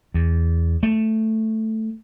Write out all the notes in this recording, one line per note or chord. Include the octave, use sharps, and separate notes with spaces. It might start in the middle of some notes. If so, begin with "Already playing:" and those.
E2
A3